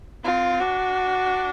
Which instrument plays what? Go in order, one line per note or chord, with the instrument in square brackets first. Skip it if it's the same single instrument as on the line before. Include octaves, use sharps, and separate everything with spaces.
[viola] C4 [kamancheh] F4
[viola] D4 [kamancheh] F#4